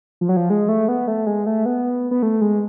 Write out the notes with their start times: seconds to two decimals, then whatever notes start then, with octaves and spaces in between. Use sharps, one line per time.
0.21 F3
0.29 F#3
0.37 F3
0.50 G#3
0.68 A3
0.88 B3
1.08 A3
1.27 G#3
1.46 A3
1.65 B3
2.11 B3
2.23 A3
2.41 G#3